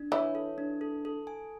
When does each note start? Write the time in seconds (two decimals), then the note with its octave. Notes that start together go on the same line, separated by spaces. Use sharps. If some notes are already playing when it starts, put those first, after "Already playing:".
Already playing: D4
0.12 E3 E4 C#5
0.35 A4
0.58 D4
0.81 A4
1.05 A4
1.27 G#5